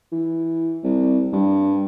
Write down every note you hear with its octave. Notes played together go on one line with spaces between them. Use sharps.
E3
C2
G2